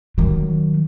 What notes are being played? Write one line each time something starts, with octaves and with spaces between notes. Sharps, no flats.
D#3 F#3